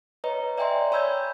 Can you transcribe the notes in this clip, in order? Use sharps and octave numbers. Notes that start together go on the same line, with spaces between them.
B4 C#5 D#5 A#5
D5 E5 G5 G#5 A#5 C6
C#5 B5 E6 G6 G#6